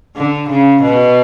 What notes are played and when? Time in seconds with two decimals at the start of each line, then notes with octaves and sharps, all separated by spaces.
0.17 D3
0.49 C#3
0.82 B2